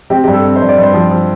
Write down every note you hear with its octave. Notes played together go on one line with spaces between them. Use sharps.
C4 G4
G2 G4
A4
C4
C5
G2
D5
G2 C5
F3
F3